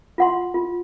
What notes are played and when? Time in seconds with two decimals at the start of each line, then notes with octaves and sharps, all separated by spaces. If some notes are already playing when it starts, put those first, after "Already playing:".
0.18 F4 F#5 C6
0.54 F4